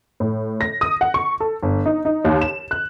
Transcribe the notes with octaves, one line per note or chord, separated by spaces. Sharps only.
A2
A#6
D#6
F#5
C#6
A4
G1
D#4
D#4
D#2
E7
F#6